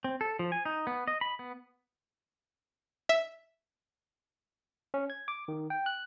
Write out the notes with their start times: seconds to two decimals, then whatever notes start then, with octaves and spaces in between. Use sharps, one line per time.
0.04 C4
0.21 A4
0.39 F3
0.52 G#5
0.65 D#4
0.87 B3
1.08 D#5
1.21 B5
1.39 B3
3.09 E5
4.94 C#4
5.10 G#6
5.28 D6
5.48 D#3
5.70 G5
5.86 F#6